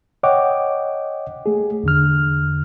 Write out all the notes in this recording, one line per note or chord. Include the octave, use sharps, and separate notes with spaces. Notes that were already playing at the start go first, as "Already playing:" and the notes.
C#5 D#5 F#5 G5 D6
A3 G#4
E2 D3 F6